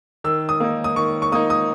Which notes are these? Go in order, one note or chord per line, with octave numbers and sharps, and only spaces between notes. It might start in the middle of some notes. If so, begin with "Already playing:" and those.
D#3 E6
D#6
A#3 D#4
D#6
D#3 C#6
C#6
A#3 D#4 D#6
D#6